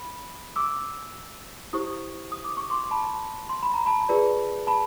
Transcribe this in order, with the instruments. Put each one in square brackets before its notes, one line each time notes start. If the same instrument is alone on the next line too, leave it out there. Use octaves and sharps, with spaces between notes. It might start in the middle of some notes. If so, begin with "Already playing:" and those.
Already playing: [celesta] B5
D6 E6
E4 G4 C5 C#6 D#6
D#6
D6
C#6
C6 D6
A5 B5
C6
B5
A#5
A5 B5
F4 G#4 B4 D5
A5 B5